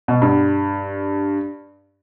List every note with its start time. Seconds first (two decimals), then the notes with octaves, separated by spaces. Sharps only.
0.08 B2
0.22 G2